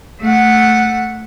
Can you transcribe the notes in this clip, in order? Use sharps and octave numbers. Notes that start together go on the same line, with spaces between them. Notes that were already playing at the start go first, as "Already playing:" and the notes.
A3 F#5